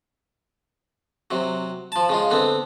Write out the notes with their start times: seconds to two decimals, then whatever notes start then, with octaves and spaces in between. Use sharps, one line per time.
1.31 C3 F#3
1.92 F3 A5
2.09 C#3 G#3 F4
2.31 D3 B3 C4